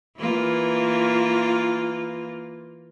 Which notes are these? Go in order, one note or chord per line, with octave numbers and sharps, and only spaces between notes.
E3 A#3 F4